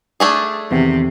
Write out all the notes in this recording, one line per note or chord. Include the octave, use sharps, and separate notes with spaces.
A3 D4 G#4
E2 C3 D#3